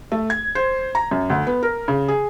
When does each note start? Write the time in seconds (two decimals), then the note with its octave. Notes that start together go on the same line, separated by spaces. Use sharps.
0.12 A3
0.30 G#6
0.55 C5
0.95 A#5
1.11 F#2
1.30 D2
1.47 B3
1.63 A#4
1.88 C#3
2.08 G#4